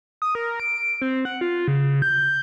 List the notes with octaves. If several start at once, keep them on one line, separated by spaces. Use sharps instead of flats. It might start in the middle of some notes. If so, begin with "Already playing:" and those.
D#6
A#4
D7
C4
F#5
F4
C#3
G6